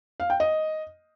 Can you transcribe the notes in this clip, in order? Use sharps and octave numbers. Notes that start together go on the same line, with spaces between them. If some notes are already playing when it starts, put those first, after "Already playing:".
F5
G5
D#5